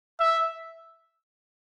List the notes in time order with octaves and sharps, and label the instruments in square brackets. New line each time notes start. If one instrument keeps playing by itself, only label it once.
[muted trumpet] E5